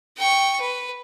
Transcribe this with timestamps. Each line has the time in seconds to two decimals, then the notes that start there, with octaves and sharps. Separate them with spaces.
0.17 G5 C#6
0.61 B4